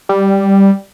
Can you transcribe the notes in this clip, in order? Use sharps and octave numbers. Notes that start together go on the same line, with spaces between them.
G3